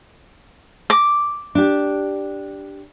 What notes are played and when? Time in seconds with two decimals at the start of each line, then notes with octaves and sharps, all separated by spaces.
0.90 D6
1.55 D4 G4